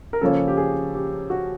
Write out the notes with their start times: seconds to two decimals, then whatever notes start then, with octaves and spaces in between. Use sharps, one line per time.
0.13 A#4
0.21 C#3 F3 A#3 C#4 A4
0.48 G4
0.57 G#4
0.95 G4
1.30 F#4